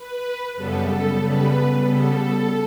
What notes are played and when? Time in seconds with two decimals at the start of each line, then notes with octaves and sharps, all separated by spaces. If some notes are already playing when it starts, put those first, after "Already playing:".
Already playing: B4
0.55 F#2 C#3 G3 B3 A4
0.87 A4
1.19 C#3 G3 B3 B4
1.81 C#3 G3 B3 A4